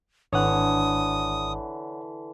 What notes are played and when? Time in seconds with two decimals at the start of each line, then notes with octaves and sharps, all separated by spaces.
0.33 G#1 D3 E3 C#5 F#5 D#6